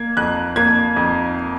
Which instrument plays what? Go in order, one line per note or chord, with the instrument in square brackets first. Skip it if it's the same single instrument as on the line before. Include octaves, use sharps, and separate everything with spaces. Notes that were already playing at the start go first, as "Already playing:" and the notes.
Already playing: [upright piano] A#3 G#6
F2 F#6
A#3 G#6
F2